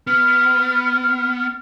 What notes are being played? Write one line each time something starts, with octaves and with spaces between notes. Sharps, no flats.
B3 F6